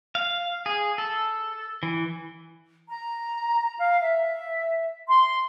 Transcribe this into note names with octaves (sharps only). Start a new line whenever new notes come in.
F5
G#4
A4
E3
A#5
F5
E5
C6